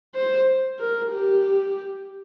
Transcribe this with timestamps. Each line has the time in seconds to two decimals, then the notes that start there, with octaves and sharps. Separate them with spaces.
0.14 C5
0.79 A#4
1.12 G4